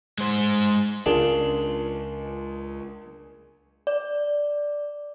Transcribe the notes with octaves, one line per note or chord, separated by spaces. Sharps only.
G#3 C5
C#2 D4 F4 G#4 A#4
D5